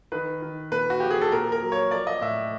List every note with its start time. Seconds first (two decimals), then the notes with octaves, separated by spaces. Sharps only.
0.12 D#3 B4
0.42 D#3
0.72 A#2 B4
0.90 F#4
1.00 F3 G4
1.11 G#4
1.21 A4
1.32 A#2 A#4
1.52 A#4
1.62 F#3
1.72 C#5
1.91 F3 D5
2.07 D#5
2.21 A2 E5